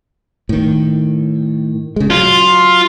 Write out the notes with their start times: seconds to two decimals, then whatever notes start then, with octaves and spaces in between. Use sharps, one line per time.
0.49 A2 D#3
1.96 C#3 G#3
2.10 F#3 F4